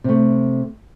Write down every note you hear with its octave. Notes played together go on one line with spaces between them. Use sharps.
C3 A3